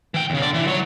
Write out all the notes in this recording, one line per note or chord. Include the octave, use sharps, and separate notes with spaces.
E3 G5
D#2 C#3
D3 D5
E3
F#3 C#5